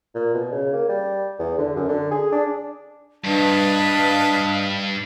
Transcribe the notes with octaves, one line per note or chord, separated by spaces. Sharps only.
A#2
B2
C#3
A#3
G3
E2
D3
F#2
D3
G#4
D4
G2 D4 B4 D#5 F5 A5